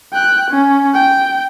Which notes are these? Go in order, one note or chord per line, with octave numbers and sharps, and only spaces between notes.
G5 F#6
C#4
G5